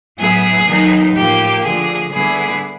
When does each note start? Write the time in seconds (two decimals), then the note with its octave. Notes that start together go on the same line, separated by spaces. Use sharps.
0.19 A2 F#3 B3 E4 G#4
0.66 D#3 F#3 B3 D#4
1.15 A2 F3 A#3 G4
1.63 D3 F3 A3 G#4
2.12 D3 G3 B3 E4 G#4